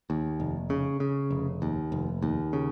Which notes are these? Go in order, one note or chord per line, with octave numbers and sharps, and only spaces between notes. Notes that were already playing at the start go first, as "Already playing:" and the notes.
D#2
F1
C#3
C#3
F1
D#2
F1
D#2
C#3